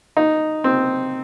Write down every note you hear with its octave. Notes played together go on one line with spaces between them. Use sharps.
D#4
C4